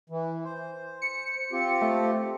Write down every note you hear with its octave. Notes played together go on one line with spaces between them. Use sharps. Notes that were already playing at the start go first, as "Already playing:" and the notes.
E3
C5
C#7
C4 F4 G4
A3